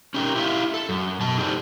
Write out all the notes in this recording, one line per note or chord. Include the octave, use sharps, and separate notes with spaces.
C#4 D#4 G4 G#4 A#4
E4 G4 B4 C#5 E5 F5
A4
F#2
B2 A5
D#4 G4 A4 C5 D5